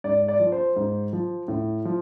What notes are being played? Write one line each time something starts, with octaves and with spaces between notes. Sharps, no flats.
G#2 D5
D5
F3
C5
G#2
F3
A2
F3